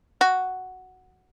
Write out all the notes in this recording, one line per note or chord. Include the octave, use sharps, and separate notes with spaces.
F#4